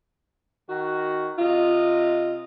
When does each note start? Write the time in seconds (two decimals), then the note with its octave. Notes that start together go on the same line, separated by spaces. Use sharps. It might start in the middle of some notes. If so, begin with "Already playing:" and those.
0.69 D#3 F#4
1.39 C3 F4 D#5